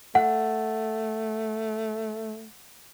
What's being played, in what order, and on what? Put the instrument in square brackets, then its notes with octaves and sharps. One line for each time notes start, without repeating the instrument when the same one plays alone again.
[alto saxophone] A3 [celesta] F#5